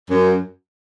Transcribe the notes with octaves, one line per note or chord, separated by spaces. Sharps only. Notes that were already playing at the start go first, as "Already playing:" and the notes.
F#2